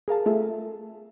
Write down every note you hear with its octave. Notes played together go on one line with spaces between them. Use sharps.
G#4 A#4 F5 A5
A3 F4 G#4 A4 E5